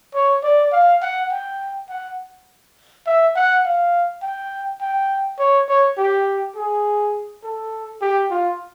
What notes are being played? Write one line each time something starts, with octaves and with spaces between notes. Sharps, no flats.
C#5
D5
F5
F#5
G5
F#5
E5
F#5
F5
G5
G5
C#5
C#5
G4
G#4
A4
G4
F4